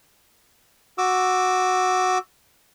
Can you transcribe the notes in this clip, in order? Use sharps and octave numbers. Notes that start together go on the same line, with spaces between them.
F#4 D6 E6